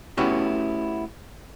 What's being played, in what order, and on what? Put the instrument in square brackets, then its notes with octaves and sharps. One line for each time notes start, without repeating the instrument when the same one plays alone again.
[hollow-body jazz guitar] A3 B3 C#4 E4 F#4 G4